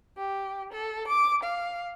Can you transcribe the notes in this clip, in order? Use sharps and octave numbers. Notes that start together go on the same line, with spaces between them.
G4
A4
D6
F5